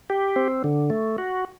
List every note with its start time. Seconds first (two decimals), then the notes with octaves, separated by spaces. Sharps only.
0.10 G4
0.36 C4
0.64 D3
0.90 A3
1.18 F#4